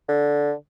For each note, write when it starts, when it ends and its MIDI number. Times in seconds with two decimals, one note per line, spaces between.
0.09 0.53 50